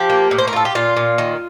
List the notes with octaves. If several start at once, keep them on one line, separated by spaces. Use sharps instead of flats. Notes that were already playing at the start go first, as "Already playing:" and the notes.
Already playing: F3 G4
A#3
A2
C5
A#4
F4 A4
G4
A#2 F4
A#2
D#3